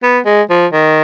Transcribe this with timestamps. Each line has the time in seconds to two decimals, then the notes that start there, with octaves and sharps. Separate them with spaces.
0.03 B3
0.26 G#3
0.50 F3
0.73 D#3